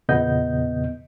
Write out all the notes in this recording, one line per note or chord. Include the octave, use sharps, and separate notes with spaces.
E2 A#2 C#3 B3 D#5 G6